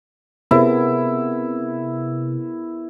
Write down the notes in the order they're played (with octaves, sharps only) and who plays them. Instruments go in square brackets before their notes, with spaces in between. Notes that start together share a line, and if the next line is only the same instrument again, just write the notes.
[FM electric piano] C3 [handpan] B3 G#4 A#4 [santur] E4